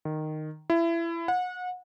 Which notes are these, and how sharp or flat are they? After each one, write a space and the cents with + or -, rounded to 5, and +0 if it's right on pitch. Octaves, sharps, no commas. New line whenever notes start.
D#3 -10
E4 +25
F#5 -30